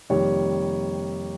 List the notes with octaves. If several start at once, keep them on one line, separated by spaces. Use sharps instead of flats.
F2 C3 D#3 G3 A#3 C#5